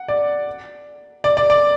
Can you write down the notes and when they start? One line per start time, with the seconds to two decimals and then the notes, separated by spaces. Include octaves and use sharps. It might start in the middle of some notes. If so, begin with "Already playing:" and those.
Already playing: F#5
0.08 D5
1.24 D5
1.37 D5
1.50 D5